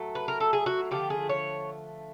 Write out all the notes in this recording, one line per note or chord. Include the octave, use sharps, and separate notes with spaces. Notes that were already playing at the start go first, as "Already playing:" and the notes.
Already playing: A2 F#3 A3
B4
A#4
A4
G#4
F#4
D3 F3 A3 G4
G#4
C#5